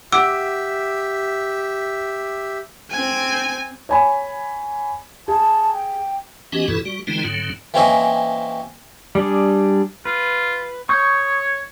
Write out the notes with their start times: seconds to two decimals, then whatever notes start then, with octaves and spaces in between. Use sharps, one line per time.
0.12 G4 E5 F#5 D6 E6 D7
2.91 C4 G#5
3.89 C#5 G#5 B5
5.28 G#4 A5
5.73 G5
6.52 E3 B3 C#4 F#4 G4 D#5
6.68 G2 B2 E3 E4 F#4 A4
6.85 G3 F#4
7.07 D3 E3 G#3 C4 D#4 F4
7.24 G#2 D3 F#3 C4
7.74 E3 A#3 C4 C#4 E4 D#5
9.15 G3 D4 G#4
10.05 F4 B4
10.89 C#5 C#6 D#6 G6